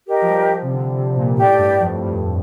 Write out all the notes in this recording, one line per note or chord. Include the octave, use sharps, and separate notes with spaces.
G4 A#4 D#5
F3
G3
F3
C3
D3
C3
C3
A#2
A2 G4 D5 G5
A2
G2
F2
G2